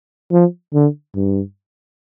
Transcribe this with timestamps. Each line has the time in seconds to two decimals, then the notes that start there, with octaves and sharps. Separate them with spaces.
0.32 F3
0.74 D3
1.15 G2